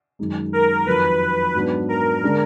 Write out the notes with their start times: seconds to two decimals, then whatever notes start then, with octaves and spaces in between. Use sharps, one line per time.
0.19 F#2 D#3 G#3 D#4
0.53 A#4
0.86 F2 D#3 F#3 B4
1.55 G#2 F#3 B3 D4
1.89 A#4
2.23 D3 G#3 D4